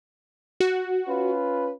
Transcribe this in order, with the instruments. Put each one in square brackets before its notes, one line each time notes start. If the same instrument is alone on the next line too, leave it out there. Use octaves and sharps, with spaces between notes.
[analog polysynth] F#4
[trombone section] C#4 F4 B4